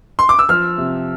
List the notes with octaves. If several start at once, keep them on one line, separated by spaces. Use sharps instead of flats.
C6
D6
E6
F3 F6
C3